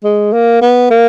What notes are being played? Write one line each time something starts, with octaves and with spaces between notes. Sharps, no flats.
G#3
A#3
B3
A#3